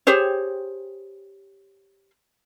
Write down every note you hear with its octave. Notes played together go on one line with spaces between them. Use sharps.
G4 G#4 C5 C#5